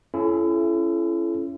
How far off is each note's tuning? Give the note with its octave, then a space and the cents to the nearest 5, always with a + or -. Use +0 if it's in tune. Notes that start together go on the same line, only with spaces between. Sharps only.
C#4 +0 E4 +35 A4 -35